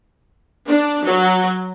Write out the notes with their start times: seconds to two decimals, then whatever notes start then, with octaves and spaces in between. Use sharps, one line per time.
0.68 D4
1.05 F#3